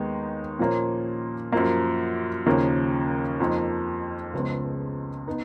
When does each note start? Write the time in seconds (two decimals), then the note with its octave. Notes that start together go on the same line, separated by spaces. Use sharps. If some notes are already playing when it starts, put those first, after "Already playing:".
Already playing: D#2 D#3 G#3 B3 D#4
0.59 A#2 F3 A#3 C#4
1.53 F#2 F3 A#3
2.46 D#2 C#3 F3 A#3 C#4
3.40 F2 F3 A#3 D#4
4.33 C#2 C#3 F3 G#3 B3
5.27 B3 D#4